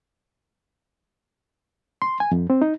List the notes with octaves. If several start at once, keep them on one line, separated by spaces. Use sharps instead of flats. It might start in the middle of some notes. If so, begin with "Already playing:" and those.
C6
G#5
F2
C4
D#4